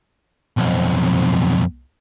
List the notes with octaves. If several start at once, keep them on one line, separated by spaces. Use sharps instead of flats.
B1 F2